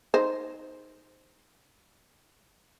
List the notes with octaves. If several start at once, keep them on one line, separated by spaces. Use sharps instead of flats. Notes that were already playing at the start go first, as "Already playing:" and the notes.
D#4 C5